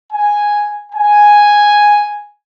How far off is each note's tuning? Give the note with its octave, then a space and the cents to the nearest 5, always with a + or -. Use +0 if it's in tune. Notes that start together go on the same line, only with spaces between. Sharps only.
G#5 -5
G#5 +0